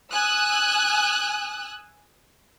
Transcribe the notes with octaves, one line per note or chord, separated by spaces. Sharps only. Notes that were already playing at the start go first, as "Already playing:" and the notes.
G#5 D#6 E6 F#6